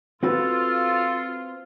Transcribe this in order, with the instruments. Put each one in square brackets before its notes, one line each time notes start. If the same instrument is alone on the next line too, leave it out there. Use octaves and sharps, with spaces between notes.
[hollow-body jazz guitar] C4 F#4 B4 [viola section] F4 [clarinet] A4